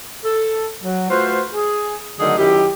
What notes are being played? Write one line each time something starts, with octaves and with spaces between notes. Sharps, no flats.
A4
F#3
A3 F4 F#4 B4 C5
G#4
D3 D#3 F#3 A3 D#4 G#4
F#2 D#3 E4 G4